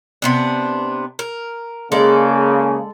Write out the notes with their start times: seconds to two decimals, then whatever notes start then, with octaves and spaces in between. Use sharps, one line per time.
0.22 C3 B3 D4
1.19 A#4
1.92 C#3 G#3 A#3 A4 D5